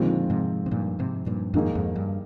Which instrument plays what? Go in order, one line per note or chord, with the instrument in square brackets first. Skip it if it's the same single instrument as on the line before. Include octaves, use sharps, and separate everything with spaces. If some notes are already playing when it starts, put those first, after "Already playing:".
Already playing: [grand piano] F2 D#3 G#3 C4 F4 [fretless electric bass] A#2 D3
[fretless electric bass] G#2 C3
C3
G2 A#2
G#2 C3
G2 A#2
[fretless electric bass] F2 G#2 [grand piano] D#3 A#3 D#4 G#4
[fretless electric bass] F2 G#2
G2